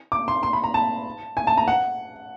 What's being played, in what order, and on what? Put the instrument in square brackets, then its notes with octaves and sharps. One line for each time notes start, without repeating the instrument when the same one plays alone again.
[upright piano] D6
C6
C6
B5
A#5
A5
G#5
A5
A#5
F#5